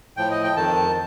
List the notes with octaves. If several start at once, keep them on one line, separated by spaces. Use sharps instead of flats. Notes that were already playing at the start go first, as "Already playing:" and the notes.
A2 F3 G5
D#5
G5
F2 D#3 A5